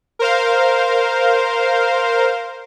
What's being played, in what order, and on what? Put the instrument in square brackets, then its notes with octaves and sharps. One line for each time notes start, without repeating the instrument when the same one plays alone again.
[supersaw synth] A#4 C5 F5